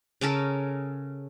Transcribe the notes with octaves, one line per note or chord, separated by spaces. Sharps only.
C#3 C#4 A4 A#4